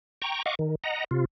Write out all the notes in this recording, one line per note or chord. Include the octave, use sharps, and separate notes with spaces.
G5 A#5 C#6
D#5 F5 F#5 C#6 D6
D#3
D#5 F#5 A#5
C3 F4